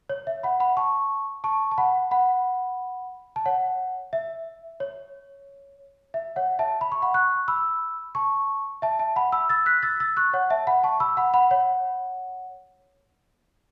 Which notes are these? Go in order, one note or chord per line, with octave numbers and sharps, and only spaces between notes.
C#5
E5
F#5 B5
F#5 B5
A5 C#6
A5 C#6
A5
F#5 B5
F#5 B5
A5
C#5 F#5
E5
C#5
E5
C#5 F#5
E5 A5
B5
C#6
F#5 B5
C#6 F#6
B5 E6
A5 C#6
E5 A5
E5 A5
F#5 B5
B5 E6
E6 A6
F#6 B6
E6 A6
E6 A6
C#6 F#6
C#5 F#5
E5 A5
F#5 B5
A5 C#6
B5 E6
F#5 B5
F#5 B5
C#5 F#5